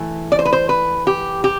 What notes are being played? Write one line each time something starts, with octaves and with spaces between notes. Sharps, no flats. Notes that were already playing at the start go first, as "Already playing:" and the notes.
Already playing: E3 A3
D5
C5
B4
C5
B4
G4
G4